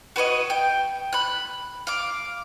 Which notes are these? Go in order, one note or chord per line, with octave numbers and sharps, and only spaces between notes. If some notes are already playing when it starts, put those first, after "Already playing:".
F#4 B4 C#5 D#5
G5
B5 F#6
F5 D6